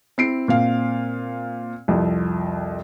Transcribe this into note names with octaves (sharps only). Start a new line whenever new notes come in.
C4 E4 C7 D7
A#2 C4 F5
C2 F2 F3